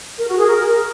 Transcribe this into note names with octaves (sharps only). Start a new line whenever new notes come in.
A#4
F#4
G#4
A#4